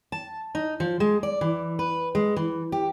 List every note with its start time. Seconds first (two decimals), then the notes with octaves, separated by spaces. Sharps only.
0.12 A5
0.55 D#4
0.80 F3
1.00 G#3
1.23 D5
1.41 E3
1.79 B4
2.15 G#3
2.36 E3
2.72 G4